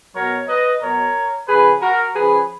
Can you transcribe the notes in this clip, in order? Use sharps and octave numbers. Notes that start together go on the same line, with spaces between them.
B2 F#3 A#4 C#5
B4 D#5
B2 F#3 A#4 C#5
C#3 F3 G#4 B4
F#4 A#4
C#3 F3 G#4 B4